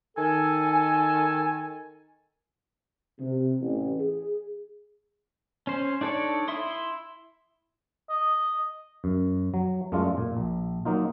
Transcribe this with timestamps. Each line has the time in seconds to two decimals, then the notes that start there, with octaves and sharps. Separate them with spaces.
0.16 D#3 A4 G#5
3.19 C3
3.61 A1
4.01 G#4
5.67 C#4 C5
6.01 D4 D#4 A4 C#5 D5
6.48 E4 E5 C6 D#6
8.10 D#5
9.04 F#2
9.54 F#3
9.92 F#2 G#3 A3 D4 F4
10.17 A#2
10.37 A#1
10.85 F#3 A#3 D#4 F4